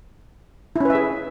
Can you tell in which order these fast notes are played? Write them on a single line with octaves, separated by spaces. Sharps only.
E4 C#4 B4 E5 G#4